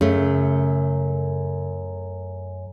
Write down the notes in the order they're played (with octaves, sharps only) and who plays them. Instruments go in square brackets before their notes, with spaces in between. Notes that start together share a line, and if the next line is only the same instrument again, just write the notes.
[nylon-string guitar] F#2 A3 [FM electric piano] C#3